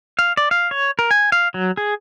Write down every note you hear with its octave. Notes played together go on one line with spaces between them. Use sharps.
F5
D5
F5
C#5
A#4
G#5
F5
F#3
G#4